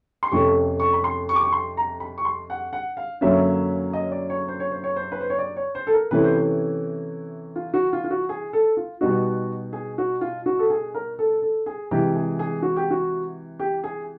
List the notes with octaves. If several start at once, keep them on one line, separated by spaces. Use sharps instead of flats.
C6
F2 C3 F3 A3 C#4 C#6
C#6
B5
C6
C#6
D6
C#6
C6
A#5
B5
C#6
C6
F#5
F#5
F5
F#2 D3 F#3 A#3 C#4 E5
D#5
D5
C#5
C5
C#5
C5
C#5
C5
B4
C5
C#5
D5
C#5
C5
A4
A#4
C3 E3 A3 C#4 E4 B4
C5
B4
F4
F#4
F4
F4
F#4
G#4
A4
F4
B2 G3 B3 D#4 F#4
G#4
F#4
F4
F#4
A4
G#4
A#4
A4
A4
G#4
C3 E3 G#3 G4
G#4
G#4
F#4
G4
F#4
G4
G#4